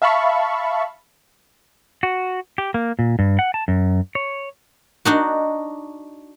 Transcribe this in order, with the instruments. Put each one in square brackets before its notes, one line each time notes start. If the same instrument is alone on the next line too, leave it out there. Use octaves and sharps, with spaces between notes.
[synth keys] E5 F5 A5 B5 C#6
[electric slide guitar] F#4
G4
A#3
A#2
G2
F#5
A5
F#2
C#5
[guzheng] D4 D#4 F#4